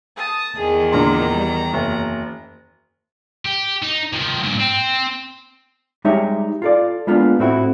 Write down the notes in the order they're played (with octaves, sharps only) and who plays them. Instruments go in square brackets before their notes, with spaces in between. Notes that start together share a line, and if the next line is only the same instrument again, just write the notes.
[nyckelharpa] A5 D#6
[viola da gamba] E2 D#3 [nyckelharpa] G#4
[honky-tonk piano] A#2 D3 C6 [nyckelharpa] A#5
[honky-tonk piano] G3
F#1
[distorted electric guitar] G4
D#4
D#3 F3
G2 A#2
C4
[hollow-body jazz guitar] G3 G#3 D#4 G4 C#5 E5
F4 A4 D5
G#3 A#3 B3 D4 F4
A2 A3 C4 E4 F#4